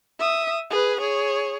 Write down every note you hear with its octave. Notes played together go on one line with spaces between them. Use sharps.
E5 D#6
G#4 B4
G#4 C#5